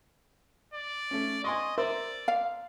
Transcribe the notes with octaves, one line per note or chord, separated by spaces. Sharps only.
D5
A3 C#4
D#5 G#5 C6 C#6
A#4 C5 D5 E5
F5